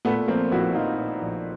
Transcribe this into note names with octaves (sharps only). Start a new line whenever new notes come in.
A#2 A3 B3
F3 A#3 C4
A#1 E4 F#4
A#1 D#4 F4
A#2
A#1